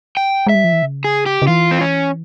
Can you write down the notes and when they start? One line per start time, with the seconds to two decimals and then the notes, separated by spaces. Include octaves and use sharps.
0.17 G5
0.47 G#3 E5
0.55 G3
0.64 F3
0.73 E3
0.83 C#3
1.04 G#4
1.26 G4
1.42 C#3
1.47 E3 F4
1.71 C4
1.81 C#4